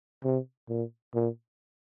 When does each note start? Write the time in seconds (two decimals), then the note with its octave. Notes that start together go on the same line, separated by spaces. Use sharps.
0.24 C3
0.69 A#2
1.14 A#2